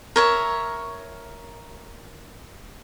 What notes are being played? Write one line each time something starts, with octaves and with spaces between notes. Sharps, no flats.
A#4 C#5 E5